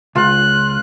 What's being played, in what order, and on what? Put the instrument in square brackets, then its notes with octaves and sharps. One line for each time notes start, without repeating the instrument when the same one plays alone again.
[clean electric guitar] C#2 [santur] F4 [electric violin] F#6